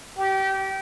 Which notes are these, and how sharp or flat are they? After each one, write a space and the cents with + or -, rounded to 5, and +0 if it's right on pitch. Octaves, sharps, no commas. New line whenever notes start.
G4 -25